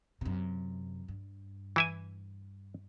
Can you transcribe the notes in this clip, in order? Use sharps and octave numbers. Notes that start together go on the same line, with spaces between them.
F#2 C3
G2
E3 E4 G#5